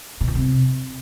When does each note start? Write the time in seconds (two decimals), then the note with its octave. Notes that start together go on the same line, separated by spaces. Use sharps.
0.21 B2
0.28 F2
0.35 C3